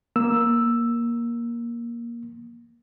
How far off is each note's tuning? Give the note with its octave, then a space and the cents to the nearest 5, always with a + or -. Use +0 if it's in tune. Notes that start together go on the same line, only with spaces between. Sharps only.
A#3 +15 E6 +0